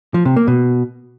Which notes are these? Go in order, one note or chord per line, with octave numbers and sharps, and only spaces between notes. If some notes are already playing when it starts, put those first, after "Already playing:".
F3
C3
A#3
B2